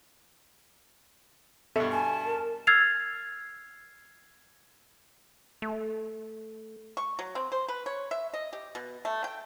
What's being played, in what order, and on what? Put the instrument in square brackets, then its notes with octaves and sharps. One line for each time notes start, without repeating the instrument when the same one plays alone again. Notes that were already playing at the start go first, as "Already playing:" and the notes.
[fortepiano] G2 B2 [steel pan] A4 E5
[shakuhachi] G#5 [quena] A5
[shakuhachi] A#4
[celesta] E6 F6 G#6 A6 C7 F7
[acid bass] A3
[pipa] C#6
F#3
C4
C5
B4
C#5
E5
D#5
G4
B2
A3
G5